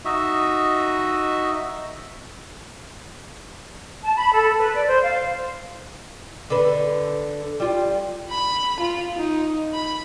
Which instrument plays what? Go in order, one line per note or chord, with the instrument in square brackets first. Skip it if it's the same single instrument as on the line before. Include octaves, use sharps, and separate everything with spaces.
[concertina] D#4 F#4 D#5 E5
[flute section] A5
B5
A4
B4
D5
C5
F5
[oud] D3 B4
G3 F4
[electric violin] B5
F4
D#4
B5